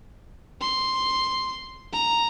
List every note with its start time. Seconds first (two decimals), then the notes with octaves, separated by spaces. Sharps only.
0.61 C6
1.93 A#5